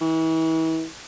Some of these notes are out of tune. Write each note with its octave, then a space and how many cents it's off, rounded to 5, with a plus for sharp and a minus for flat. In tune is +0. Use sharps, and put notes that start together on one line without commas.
E3 -35